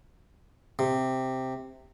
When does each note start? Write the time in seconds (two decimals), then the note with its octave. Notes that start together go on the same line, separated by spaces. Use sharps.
0.79 C3